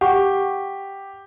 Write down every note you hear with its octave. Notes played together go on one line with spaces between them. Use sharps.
G4 F#5 C#6